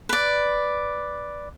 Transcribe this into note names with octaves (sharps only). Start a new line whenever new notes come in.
B4 D5